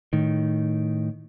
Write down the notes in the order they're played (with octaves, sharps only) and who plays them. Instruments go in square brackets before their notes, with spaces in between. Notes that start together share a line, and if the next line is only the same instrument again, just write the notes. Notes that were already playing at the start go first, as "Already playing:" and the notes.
[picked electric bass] A2 D#3